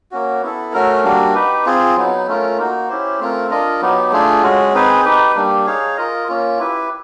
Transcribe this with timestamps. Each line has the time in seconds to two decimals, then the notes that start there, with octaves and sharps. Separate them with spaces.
0.11 A#3 C#4 F#4
0.42 B3 E4 A4
0.73 A3 C#4 F#4 A#4
1.04 G3 A#3 D4 F#4
1.35 D#4 G4 B4
1.66 C4 F4 G#4
1.96 F#3 B3 D#4
2.27 A3 C#4 F4 A#4
2.58 A#3 D#4 F#4
2.89 C#4 E4 G4 C5
3.20 A3 C4 F4 A#4
3.50 D4 F4 A#4 D#5
3.81 F#3 B3 D#4 G4
4.12 A3 D4 F4 G#4
4.43 G#3 C#4 F#4
4.74 C4 D#4 G#4 B4
5.05 D#4 G4 B4
5.36 G3 A#3 D4 G4
5.66 D#4 G#4 C#5 F5
5.97 F4 A#4 D#5
6.28 A#3 C#4 F4
6.59 E4 G4 B4